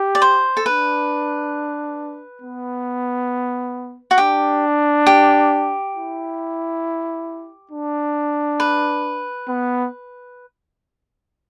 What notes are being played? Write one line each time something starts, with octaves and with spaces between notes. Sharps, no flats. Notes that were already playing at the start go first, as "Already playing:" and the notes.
Already playing: G4
D5
C5
A4
D4 B4
B3
F#4
D4 G4
G4
E4
D4
B4
B3